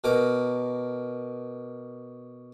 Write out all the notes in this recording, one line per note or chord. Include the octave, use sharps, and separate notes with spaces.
B2 A#4 D6